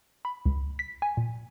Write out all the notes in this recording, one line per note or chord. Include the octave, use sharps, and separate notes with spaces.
B5
C#2
B6
G#5
A#2